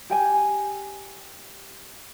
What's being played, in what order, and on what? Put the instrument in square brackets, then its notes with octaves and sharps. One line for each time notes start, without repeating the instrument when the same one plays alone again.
[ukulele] G4 G5 G#5